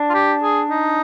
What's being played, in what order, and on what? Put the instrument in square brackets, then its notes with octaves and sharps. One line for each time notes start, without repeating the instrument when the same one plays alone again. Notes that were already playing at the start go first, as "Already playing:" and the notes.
Already playing: [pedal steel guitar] D4
[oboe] F4
G4
G#4
D#4